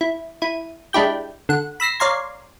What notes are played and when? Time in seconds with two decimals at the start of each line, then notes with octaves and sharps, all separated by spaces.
0.01 E4
0.42 E4 D#7
0.93 G#3 D4 E4 G4 G6
1.49 D3 F#5
1.80 B5 E6 A#6 C7
2.00 C#5 D5 F5 A#5 C6 G#6